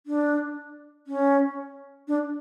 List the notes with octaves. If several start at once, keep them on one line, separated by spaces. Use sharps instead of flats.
D4
C#4
D4